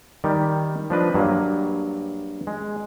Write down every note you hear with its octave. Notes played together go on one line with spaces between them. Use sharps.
D#3 G3 G4
F3 D4 B4 D#5
G2 F#3 A#3
G#3